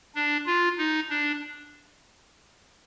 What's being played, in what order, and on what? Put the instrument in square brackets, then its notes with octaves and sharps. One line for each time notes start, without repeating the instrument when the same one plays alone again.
[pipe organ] D4
F4
D#4
D4